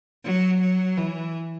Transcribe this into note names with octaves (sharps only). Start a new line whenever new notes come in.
F#3
F#3
E3